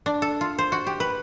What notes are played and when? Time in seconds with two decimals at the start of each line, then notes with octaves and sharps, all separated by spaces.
0.06 D4
0.22 A4
0.41 F4
0.58 C5
0.72 F#4
0.87 G4
1.00 B4